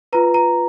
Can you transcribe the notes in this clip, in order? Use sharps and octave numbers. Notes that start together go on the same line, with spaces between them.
F4 B4 A#5
A#5